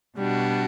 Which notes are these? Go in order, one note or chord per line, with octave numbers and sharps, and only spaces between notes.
B2 G3 D4 F#4